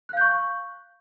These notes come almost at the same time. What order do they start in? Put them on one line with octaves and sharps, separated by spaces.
F#6 F5 G6 C#6